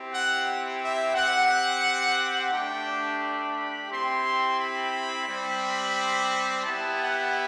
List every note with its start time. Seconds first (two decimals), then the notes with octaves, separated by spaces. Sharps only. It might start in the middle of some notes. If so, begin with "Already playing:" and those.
Already playing: C4 E4 G4
0.11 F#5
0.80 E5
1.14 C4 G4 F#5
2.52 A3 D4 G4 G5
3.20 B5
3.89 C4 E4 G4 C6
4.58 B5
5.26 G3 C4 G4
6.63 B3 E4 G4 A5
6.98 F#5